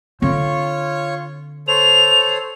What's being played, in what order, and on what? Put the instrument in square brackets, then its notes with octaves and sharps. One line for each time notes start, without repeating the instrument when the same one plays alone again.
[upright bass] D3 C4 [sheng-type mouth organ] F4 C#5 C#6
[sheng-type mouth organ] A4 C5 C#5 [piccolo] F7